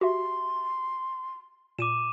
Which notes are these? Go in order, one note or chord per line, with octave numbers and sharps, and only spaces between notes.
F#4 G4 E5 C6
A#2 D6 D#7 E7